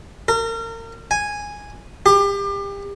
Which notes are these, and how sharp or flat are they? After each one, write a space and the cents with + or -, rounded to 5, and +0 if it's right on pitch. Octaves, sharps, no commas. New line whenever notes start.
A#4 -35
G#5 -5
G4 +30